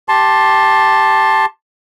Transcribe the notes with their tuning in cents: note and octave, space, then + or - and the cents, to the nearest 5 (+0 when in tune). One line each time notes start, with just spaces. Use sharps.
G4 +0 A5 +0 C6 +15